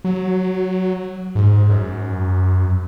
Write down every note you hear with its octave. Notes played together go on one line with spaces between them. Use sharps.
F#3
G#2
F#2